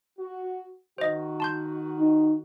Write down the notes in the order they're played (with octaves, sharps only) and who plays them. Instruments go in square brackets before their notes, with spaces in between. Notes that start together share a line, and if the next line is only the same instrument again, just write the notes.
[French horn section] F#4
[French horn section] D#3 F#4 [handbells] C5 D#5
[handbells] A5 C6 G6
[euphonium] D#4